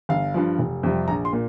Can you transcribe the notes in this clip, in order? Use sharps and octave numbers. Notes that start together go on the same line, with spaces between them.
G1 F5
G2 F3
F1
F2 C3 G3
A#1 A#5
C6
A#2